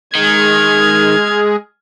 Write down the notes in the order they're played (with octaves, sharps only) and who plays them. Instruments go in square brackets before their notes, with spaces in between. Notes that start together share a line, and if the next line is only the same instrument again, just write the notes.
[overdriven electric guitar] D#3 [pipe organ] G#3 G#4 [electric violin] F6 G#6